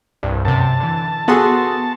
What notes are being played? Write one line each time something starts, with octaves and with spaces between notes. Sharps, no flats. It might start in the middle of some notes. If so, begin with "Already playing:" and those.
C2 G2
F#2 C3 A5
D3 E3
B3 F#4 G#4 A4 C6